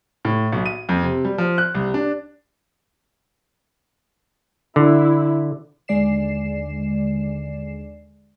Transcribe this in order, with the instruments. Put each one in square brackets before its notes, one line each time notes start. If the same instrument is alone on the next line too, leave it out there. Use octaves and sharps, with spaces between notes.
[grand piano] A2
B1
D#7
F2
C3
G3
F3
F#6
C2
D4
[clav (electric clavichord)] D3 [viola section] E4
[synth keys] D#2 D3 G#3 D5 C7 E7